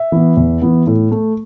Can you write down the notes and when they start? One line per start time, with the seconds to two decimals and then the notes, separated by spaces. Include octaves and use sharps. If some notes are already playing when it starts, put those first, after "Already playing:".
Already playing: E5
0.12 E3 B3
0.37 E2
0.62 E3 B3
0.87 A2
1.11 A3